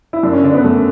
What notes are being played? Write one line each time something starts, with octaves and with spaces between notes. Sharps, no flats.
E4
F#2 D4
C#4
D3 D4
B3
F#2 A3